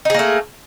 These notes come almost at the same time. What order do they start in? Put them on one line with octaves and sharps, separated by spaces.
D#4 G#4 A#3 A3